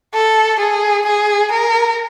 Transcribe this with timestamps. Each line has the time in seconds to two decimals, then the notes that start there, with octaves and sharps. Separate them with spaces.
0.14 A4
0.60 G#4
1.06 G#4
1.52 A#4